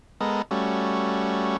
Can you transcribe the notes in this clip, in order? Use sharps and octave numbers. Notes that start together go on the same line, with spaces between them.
G#3 B3 A4 A#4 D#5
G3 A3 C#4 F#4